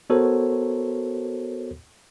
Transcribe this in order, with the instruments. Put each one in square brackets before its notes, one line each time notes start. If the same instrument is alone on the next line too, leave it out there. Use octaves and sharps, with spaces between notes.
[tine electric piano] B3 F#4 A4 A#4 C5 C#5